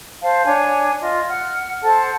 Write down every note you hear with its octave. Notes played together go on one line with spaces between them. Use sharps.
C5 F5 A5
D4 C#5 G#5
F4 D#5
F#5 F6
A4 C5 F#5 A5